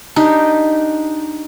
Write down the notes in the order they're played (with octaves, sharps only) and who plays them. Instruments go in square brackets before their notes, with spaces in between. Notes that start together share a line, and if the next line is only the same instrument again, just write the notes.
[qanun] D4 D#4 G4